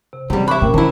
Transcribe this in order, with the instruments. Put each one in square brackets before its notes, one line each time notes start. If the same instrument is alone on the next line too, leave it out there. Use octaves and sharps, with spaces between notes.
[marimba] C3
[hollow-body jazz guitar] C#2 G3 [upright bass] E3 [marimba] C4
[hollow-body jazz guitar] E5 B5 [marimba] C#6 D6 F#6
[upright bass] A#2 [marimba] C#4 A#4 G5
[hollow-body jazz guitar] C3 E4 [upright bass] D#3 [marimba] A5